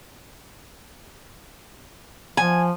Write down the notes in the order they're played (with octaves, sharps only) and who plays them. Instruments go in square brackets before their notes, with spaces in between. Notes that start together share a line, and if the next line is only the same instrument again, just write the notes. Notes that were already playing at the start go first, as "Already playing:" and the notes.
[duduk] F3 [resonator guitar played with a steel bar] G#5